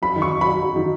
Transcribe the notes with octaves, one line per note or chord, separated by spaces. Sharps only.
F#2 B5
D#3
C#6
F#2
B5
F#3
F#3
D#3